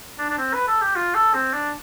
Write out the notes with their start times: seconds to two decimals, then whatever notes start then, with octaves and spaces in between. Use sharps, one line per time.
0.19 D4
0.30 D4
0.38 C4
0.54 B4
0.68 A4
0.82 G4
0.96 F4
1.15 A4
1.34 C4
1.53 D4